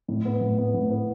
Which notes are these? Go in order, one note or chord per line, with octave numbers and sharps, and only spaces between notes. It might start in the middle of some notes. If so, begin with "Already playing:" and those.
A2
B3
A2
B3
A2
B3